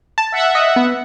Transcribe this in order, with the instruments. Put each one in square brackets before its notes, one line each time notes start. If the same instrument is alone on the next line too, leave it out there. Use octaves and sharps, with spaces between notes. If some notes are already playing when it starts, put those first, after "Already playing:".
[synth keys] A5
[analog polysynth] E5 F#5
[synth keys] D#5
B3